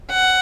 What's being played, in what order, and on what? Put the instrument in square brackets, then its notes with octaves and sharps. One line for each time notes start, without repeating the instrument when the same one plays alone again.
[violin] F#5